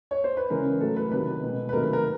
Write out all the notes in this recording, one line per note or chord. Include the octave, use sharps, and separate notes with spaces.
C#5
C5
B4
C#3 E3 G#3 A#4
A2 F#3 A3 A4
B4
C3 D#3 F#3 B4
B2 G#3
B4
C3 D#3 F#3 A3 A#4
B4
A#4